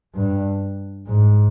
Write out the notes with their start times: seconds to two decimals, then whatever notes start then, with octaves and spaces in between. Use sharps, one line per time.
0.15 G2
1.07 G#2